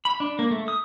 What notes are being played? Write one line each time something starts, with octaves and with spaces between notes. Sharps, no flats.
B5
D4
A#3
A3
D#6